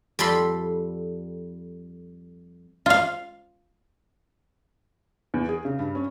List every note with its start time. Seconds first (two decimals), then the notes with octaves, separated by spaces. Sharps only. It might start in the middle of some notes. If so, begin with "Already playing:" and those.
0.19 F2 G3 A4 B5 C6
2.86 F4 F5
5.34 E2
5.49 G#4
5.65 C#3
5.79 G2
5.95 C#4